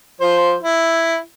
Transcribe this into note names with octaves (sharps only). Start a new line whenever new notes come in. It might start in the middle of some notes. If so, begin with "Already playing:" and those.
F3 C5
E4